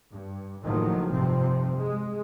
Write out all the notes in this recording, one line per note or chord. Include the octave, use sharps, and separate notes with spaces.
G2
F#1 A2 D#3 F3 F#3
F1 G2 C3 F3 C4
G#3